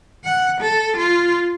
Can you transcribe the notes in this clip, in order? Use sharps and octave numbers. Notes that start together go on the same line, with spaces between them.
F#5
A4
F4